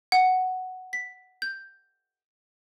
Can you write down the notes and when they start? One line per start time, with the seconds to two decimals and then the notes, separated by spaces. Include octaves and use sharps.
0.12 F#5
0.93 B6
1.42 G6